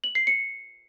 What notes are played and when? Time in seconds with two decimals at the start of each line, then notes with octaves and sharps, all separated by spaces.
0.04 F#7
0.15 C7
0.27 C#7